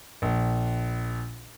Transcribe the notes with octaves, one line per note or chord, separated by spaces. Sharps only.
A#1